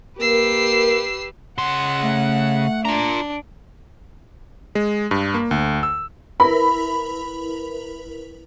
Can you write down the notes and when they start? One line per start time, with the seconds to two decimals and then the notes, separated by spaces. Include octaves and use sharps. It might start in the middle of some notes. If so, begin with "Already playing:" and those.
0.20 A#3 G4 A#4 B4 E6 C7
1.58 C#3 F#5 C6
2.02 A3
2.85 D4 F4 A#5
4.75 G#3
5.11 G2
5.34 A#3
5.51 D2
5.83 E6
6.40 E4 A#4 B4 B5